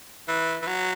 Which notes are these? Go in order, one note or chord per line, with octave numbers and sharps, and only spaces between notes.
E3
E3
F#3